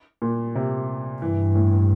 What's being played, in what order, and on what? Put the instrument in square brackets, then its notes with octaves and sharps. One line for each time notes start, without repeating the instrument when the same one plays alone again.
[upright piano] A#2
C3
[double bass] G2 [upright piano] E3
[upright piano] A2